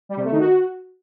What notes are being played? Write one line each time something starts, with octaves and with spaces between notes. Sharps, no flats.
G3
C3
A3
D#3
F#4